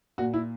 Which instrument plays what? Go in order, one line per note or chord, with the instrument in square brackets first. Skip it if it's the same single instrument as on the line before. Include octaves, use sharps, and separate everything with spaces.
[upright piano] A#2 F#4
E4